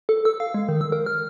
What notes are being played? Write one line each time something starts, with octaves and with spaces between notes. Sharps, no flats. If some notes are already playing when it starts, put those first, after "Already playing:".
A4
E6
F5
G#3
D#3
E6
A#4
F6